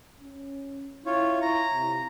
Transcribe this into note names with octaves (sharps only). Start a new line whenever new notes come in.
C#4
E4 F4 C#5
A#5
C3